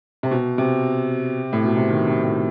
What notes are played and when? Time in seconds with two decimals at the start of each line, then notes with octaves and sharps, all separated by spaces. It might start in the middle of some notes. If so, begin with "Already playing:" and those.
0.23 C3
0.31 B2
0.58 C3
1.53 A2
1.64 B2
1.77 C3
1.89 D#3
2.07 C3
2.25 A2